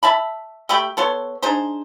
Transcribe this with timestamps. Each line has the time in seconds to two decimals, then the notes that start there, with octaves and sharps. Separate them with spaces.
0.03 E5 A5 B5
0.69 A3 G4 G5 B5
0.97 B3 A4 C#5 C6
1.42 D4 D#4 G#4 C5